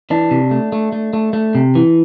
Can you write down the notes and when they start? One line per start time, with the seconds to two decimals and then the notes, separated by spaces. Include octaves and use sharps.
0.10 E3 D4
0.31 C3
0.51 A3
0.72 A3
0.92 A3
1.13 A3
1.33 A3
1.55 C3
1.75 E3